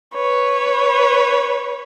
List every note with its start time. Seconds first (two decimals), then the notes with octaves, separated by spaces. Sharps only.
0.14 B4 C#5